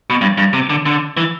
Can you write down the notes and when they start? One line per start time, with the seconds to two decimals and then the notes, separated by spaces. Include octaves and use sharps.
0.10 B2
0.21 G2
0.38 G2
0.53 C3
0.70 D3
0.86 D3
1.17 E3